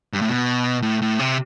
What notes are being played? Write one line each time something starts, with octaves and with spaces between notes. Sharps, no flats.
G2
A2
B2
A2
A2
C3